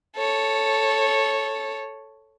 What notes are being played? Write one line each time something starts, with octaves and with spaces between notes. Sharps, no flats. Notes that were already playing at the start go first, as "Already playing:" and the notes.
A4 C#5